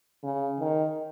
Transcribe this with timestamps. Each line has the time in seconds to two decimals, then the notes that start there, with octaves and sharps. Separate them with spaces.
0.24 C#3
0.60 D#3